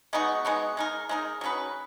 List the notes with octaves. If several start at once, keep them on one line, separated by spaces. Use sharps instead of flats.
G#3 B3 D#4 F#4
G#3 B3 D#4 F#4
G#3 D#4 A#4
G#3 D#4 A#4
F#3 C#4 G#4 B4